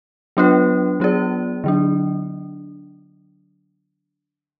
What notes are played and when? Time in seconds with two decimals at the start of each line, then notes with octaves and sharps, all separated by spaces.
0.37 F#3 B3 D4 F4 B4
1.00 F#3 B3 F4 G#4 D5
1.64 D3 F#3 D4